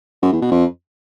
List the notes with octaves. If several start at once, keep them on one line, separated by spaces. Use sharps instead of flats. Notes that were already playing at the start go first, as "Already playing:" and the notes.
F#2
E2
B2
F2